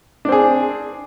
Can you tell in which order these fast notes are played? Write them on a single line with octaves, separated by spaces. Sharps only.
D4 C4 G#4